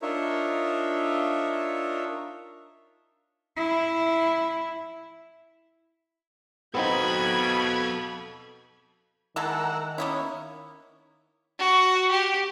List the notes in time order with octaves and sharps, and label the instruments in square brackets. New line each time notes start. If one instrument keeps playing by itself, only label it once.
[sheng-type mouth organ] D4 D#4 F4 A#4 C#5 E5
[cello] E4
[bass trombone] B2 [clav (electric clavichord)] B3 C4 D#4 [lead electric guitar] A4 F5 [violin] B5 G#6
[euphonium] D#3 [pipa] E3 G#3 A4 [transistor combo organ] A#4 F#5 E6
[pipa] A#3 B3 E4 [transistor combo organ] C#4
[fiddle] F#4
G4